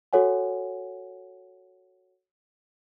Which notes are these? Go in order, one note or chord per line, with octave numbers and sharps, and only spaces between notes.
F#4 A4 C#5 F#5 G#5